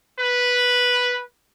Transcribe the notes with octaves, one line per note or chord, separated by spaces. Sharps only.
B4